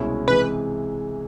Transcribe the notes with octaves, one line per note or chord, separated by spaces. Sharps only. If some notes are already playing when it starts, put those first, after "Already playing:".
Already playing: C2 B2 G#3 C#4 E4
C3 E3 G#3 B4